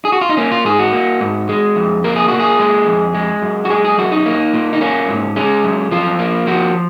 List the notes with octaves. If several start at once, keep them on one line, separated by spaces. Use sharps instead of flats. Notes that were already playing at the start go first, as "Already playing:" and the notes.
G#4
F#4
F4
D#4
A#3 C#4
F4
G#2 G#4
F#4
A#3
G#2
G#3
F2
A#3 A#4
G#4
A#2 F#4
G#4
G#3
F2
G#3
F#2
F#4
G#3 G#4
G#4
F#2 F#4
D#4
A#3
A#2
D#4
A#3 C#4
G#2
G#3 C#4
F#2
F3 F4
A#3
F3 F#4